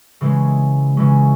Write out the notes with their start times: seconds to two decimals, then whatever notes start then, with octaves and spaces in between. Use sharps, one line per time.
0.21 C#3 E3 G#3 C#4
0.97 C#3 E3 G#3 C#4